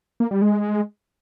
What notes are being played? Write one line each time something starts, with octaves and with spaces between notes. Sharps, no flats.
A#3
G3
G#3